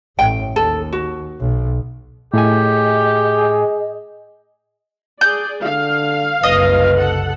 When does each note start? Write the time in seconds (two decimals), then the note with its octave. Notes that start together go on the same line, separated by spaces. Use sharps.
0.19 A1 A2 G5
0.56 D#2 A4
0.93 F#4
1.40 B1
2.34 A2 G4 G#4 D#5 G#5
5.21 G#4 D5 G6
5.63 D3 F5
6.43 F#1 C2 B4 D#5
6.97 A4 F#5